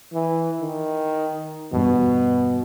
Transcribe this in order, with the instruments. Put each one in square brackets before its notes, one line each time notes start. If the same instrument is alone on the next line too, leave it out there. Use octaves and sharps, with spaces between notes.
[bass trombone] E3
D#3
[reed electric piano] E2 G2 [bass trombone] B2